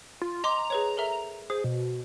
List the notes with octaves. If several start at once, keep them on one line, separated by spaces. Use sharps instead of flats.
F4
D#5 A#5 C6 D6
G#4 B4 C#5
A4 A#4 E5
G#4 C5
B2